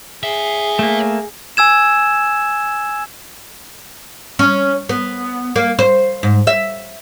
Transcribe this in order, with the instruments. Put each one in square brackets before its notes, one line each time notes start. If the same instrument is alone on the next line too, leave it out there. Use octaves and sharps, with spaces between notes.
[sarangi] G#4 [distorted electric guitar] C#5 E5
[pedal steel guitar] A3 A#3
[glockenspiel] G#5 E6 G#6 E7
[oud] C#4
B3
A#3
C5
G#2
E5